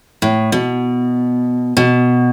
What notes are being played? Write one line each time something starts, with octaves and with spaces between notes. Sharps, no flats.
A2
B2
B2